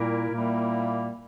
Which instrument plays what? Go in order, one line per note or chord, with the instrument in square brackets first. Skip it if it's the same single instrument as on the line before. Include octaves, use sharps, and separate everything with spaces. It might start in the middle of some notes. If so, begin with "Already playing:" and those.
Already playing: [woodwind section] A#2 G3 A#3 E4 [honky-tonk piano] A#4
[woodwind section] A#2 G3 A#3 E4